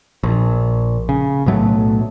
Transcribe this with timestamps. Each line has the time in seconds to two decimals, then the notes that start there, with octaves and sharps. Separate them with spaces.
0.23 A#1
1.09 C#3
1.46 B1 A2 F#3 A3